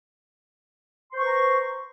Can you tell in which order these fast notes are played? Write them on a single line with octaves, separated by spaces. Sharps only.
C6 C5 C#6 B4 A#5